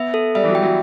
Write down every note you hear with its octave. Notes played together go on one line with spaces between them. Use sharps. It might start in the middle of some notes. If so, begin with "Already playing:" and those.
Already playing: B3 E5
A4
G3 E5
E3
F#3
G5
F#3